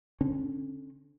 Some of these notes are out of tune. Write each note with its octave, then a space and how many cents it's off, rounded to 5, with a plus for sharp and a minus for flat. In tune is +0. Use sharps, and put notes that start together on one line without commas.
D3 -15 C#4 -45